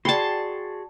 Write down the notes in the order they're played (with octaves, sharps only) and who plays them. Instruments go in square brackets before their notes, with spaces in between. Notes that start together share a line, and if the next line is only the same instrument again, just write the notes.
[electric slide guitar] F#4 G#4 [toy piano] D5 G5 B5 [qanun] A5 C6